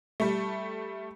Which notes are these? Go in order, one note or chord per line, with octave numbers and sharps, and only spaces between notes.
G3 A3